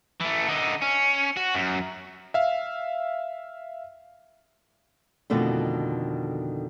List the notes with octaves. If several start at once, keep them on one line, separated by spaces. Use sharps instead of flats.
E3 A3
D3 D#4
C#4
F#4
F#2
E5 F5
F2 B2 D3 D#3 A3